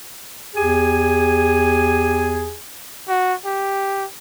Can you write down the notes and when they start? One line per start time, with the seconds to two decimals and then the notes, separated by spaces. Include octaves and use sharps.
0.55 E2 G4 G#4 G#5
3.09 F#4
3.45 G4